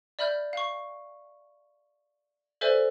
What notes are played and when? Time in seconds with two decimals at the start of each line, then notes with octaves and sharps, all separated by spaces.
0.19 D5 E5 B5 F6 G6
0.53 F5 C#6
2.61 A4 B4 C5 D5 E5 G#5